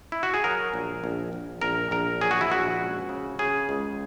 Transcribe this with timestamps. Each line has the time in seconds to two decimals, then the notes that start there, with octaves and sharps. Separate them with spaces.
0.12 E4
0.23 F#4
0.34 G#4
0.44 F#3 A#4
0.74 A#1
1.04 A#1
1.33 A#1
1.61 A#1 A#4
1.91 A#1 A#4
2.21 F#3 G#4
2.31 F#4
2.41 E4
2.50 A#1 F#4
2.80 C#2
3.09 C#3
3.39 C#3 G#4
3.69 C#2